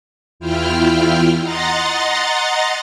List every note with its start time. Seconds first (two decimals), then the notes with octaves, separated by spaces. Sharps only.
0.40 E2 E4 F4 G5 F6
1.42 D#5 F#5 A#5 C6 A6